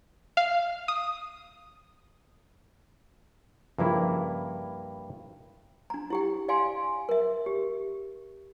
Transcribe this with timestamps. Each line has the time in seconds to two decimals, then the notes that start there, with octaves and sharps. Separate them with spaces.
0.37 F5
0.88 D#6
3.79 G2 C#3 F3 A#3 E4
5.90 D4 A#5
6.10 E4 G4 G5
6.49 D5 F5 G5 G#5 C6
7.09 A#4 E5
7.46 G4